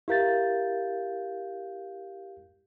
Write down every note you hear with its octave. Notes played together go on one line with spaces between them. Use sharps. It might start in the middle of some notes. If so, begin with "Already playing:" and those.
E4 G4 A#4 F5 G6 A6